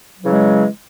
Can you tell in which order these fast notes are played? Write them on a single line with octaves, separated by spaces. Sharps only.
F#3 E3 C#3 G#3